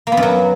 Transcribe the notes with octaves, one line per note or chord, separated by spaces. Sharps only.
A#3
B3
F#2
F#3